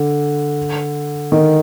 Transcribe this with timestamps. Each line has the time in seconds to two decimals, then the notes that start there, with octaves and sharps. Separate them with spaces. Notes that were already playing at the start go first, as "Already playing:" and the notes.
Already playing: D3
1.32 D#3